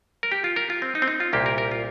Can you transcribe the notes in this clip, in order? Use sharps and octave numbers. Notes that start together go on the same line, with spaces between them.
A#4
G4
F4
A#4
F4
C4
D#4
C4
D#4
F4
C2 A#2 A#3 G4
A#4
A#4
F4